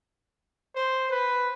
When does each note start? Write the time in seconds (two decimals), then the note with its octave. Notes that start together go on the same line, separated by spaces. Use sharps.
0.76 C5
1.11 B4